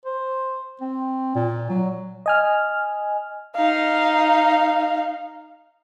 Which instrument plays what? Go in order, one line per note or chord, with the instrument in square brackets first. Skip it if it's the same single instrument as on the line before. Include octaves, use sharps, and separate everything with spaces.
[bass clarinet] C5
C4
A#2
F#3
[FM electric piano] D#5 G#5 F6
[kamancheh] D#4 F5